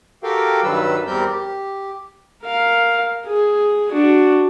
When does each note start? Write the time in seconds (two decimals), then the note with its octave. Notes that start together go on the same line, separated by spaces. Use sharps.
0.23 F#4 G4 A4 A#4 F5 G5
0.64 G2 D#3 F#3 G3 B4 E6
1.07 E2 G3 C4 G4 A#4 G6
1.29 G4
2.43 A#4 F5
3.26 G#4
3.92 D4 F#4